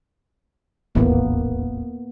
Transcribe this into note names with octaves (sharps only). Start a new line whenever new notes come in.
D#1 A1 E2 A#3 B3